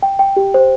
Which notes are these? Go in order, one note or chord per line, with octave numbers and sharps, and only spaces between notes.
G5
G5
G4
C5